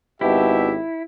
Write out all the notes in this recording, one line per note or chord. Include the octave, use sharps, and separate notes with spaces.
G#1 B2 E4 G4 E5